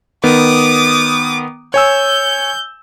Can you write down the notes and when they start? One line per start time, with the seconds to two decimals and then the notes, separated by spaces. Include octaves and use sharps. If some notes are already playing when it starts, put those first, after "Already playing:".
0.23 D#3 B3 D6 D#6
1.74 C#5 G#5 E6 G6